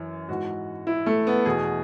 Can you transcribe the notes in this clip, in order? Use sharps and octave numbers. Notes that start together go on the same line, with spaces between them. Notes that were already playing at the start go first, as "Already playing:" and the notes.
Already playing: F#2 E3
G#2 E3 F#4
E4
A3
B3
E2 B2 G#4